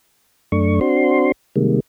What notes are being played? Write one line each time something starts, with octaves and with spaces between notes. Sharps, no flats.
F#2 A3 D4 C#6
C4 D4 F#4 C6
C3 D#3 G3 G#3 A#3